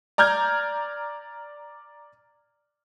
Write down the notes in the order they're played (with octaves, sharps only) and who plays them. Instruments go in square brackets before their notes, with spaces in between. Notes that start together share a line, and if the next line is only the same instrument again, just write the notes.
[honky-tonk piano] D5 A#5 F6 G6 G#6